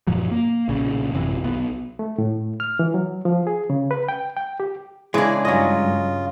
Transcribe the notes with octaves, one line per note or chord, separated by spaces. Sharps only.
F#2 A#2 F3 F#3
A#3
B1 A#2 C#3
A1 F#2 C3 E3
B1 B3
A3
A2
F6
E3
F#3
F3
G#4
C#3
B4
G5
G5
G4
C#3 E3 G#3 D4
G2 F#3 C#4 F4 D#5